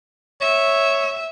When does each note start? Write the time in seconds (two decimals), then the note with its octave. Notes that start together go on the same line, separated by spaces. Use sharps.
0.41 C#5 E5